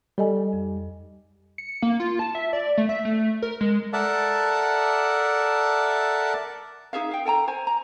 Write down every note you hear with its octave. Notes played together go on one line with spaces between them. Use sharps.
G3 A4 D#5 G#5
F2
C#7
A#3
F4
A5
E5
D5
A3
E5
A3
A#4
G#3
A4 A#4 D5 E5 F#5 A5
D#4 G#4 E5 F5
F5 G5
A4 G5 G#5 A#5
C5 G#5
A#5